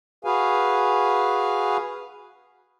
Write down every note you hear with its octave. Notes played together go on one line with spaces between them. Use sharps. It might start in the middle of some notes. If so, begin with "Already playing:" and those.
F#4 G#4 B4 F5 G#5